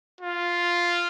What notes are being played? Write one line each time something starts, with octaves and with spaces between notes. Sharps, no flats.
F4